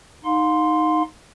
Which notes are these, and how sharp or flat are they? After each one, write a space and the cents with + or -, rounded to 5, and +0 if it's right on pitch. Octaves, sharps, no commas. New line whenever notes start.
D#4 +0 F5 +40 C6 -5